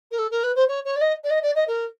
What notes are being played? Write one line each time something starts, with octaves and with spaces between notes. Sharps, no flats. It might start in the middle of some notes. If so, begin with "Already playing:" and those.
A#4
A4
A#4
B4
C5
C#5
C#5
D5
D#5
D5
D#5
D5
D#5
A#4